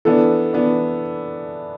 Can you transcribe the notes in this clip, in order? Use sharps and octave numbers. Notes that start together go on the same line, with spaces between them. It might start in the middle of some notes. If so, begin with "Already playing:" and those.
E3 B3 D4 A4
E3 B3 D4